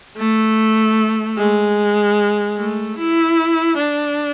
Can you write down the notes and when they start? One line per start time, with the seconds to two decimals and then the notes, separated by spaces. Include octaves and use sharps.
0.17 A3
1.37 G#3
2.57 A3
2.98 E4
3.77 D4